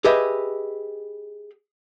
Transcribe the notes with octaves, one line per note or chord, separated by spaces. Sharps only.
G4 G#4 B4 D#5 E5